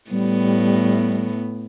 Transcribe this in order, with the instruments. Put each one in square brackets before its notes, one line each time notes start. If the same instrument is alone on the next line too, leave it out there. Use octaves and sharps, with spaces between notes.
[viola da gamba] A2 B3 [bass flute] G3